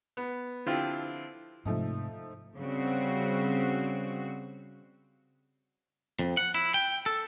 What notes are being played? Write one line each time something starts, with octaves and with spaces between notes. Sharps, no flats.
B3
D3 F3 C4 E4 F4 G4
G#2 C3 F3 A3 D#4
C#3 G3 C4 F#4
F2
F#5
E4
G5
A4